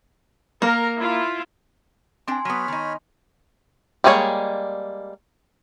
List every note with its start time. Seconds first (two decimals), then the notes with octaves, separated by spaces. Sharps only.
0.62 A#3 A#4
0.98 E4 F4
2.28 C4 D4 G5 G#5 C6
2.45 F#3 B3 C#5 B5 F6
2.68 D#3 D#4
4.04 G3 G#3 A#3 G#4 C#5